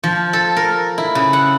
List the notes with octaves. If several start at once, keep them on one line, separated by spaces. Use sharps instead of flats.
F3
A4
A#4
E4
C#3
F#5